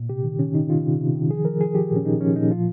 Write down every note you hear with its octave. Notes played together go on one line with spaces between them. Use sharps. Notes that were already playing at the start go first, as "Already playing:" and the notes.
Already playing: A#2
C3 G4
D#3
D#3 C#4
D#3 D#4
D#3 F4
C3
C3
D#3
F3 G#4
F3 A#4
F3 G#4
F3 G4
A#2
C#4
A#2 D#4
F3 C#4
A#2 D#4
F3 F4